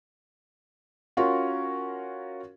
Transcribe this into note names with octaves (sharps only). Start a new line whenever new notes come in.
C#4 F4 F#4 A#4